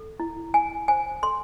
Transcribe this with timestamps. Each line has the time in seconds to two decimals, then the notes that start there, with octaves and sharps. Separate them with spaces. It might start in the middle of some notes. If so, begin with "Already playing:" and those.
Already playing: A4
0.20 E4
0.54 E4 G#5
0.88 C5 G#5
1.23 A4 C6